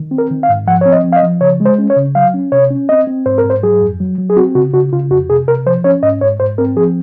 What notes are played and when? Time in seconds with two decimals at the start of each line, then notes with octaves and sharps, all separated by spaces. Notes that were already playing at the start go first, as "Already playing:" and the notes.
Already playing: D#3
0.11 C4
0.18 A#4
0.31 D#3
0.43 F5
0.49 G#2
0.67 F3 F#5
0.81 C4 C#5
0.92 D#5
1.04 F3
1.12 F5
1.16 D#5
1.23 F3
1.41 C#3 C#5
1.60 G#3
1.66 C5
1.79 C#4
1.90 C#5
1.96 C#3
2.15 F#3 F5
2.34 C#4
2.52 C3 C#5
2.70 C#4
2.89 C4 D#5
3.07 C4
3.26 G#2 C5
3.38 A#4
3.44 G#2
3.50 C5
3.63 F#3 G#4
3.81 F2
4.00 F#3
4.18 F#3
4.30 G#4
4.37 C4 F#4
4.55 C#3 F#4
4.73 C#3 F#4
4.92 C#3 F4
5.11 F2 F#4
5.30 C3 G#4
5.48 C3 A#4
5.66 F3 C5
5.84 C#4 C#5
6.03 G#2 D#5
6.21 G#2 C#5
6.40 G#2 C5
6.58 C4 A#4
6.77 F3 G#4